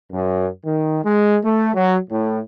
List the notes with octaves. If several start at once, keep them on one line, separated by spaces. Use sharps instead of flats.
F#2
D#3
G#3
A3
F#3
A2